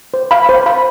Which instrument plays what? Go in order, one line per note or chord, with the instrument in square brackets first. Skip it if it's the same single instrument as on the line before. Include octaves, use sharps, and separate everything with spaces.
[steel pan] C5
F5 B5
C5
F5 B5